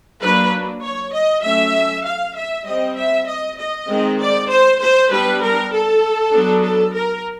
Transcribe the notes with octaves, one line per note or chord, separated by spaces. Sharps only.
F#3 A#3 D4 B4
C#5
D#5
F#3 A3 C#4 E5
F5
E5
G3 C4 D#5
E5
D#5
D#5
D#3 G#3 C4
D5
C5
C5
G3 B3 D4 B4
A#4
A4
F#3 B3 D4
A4
A#4